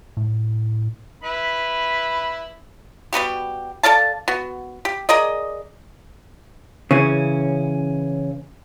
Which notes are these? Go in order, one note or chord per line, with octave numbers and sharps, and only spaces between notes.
A2
E4 B4 B5
G3 B3 F#4 G4
A4 D5 F5 A5
B3 F#4
G4
G#4 A#4 D5 D#5
C#3 E3 C#4